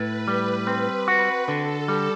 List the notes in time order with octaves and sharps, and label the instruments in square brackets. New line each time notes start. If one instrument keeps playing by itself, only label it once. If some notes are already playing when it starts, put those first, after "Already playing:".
Already playing: [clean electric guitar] A2 [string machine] B4
[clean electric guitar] G3
C4
F#4
[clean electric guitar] D3 [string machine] A4
[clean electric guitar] G3